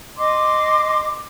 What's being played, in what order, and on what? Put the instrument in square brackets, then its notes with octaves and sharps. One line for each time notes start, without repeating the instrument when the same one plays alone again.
[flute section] D#5 C6 D6